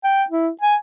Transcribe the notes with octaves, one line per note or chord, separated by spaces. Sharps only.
G5
E4
G#5